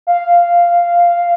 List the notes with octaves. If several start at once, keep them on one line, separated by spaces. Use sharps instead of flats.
F5